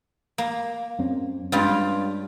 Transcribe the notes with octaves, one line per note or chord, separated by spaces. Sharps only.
A#3
F#2 C4 C#4
G2 G#3 C#4 F4 G4